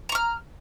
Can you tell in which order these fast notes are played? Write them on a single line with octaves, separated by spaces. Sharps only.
A#5 C#6 F6